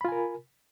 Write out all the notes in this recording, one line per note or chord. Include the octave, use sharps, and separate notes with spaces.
F4 A#4 G#5 B5